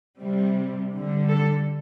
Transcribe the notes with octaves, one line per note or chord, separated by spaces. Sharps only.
C3 G3
D3 G3
A4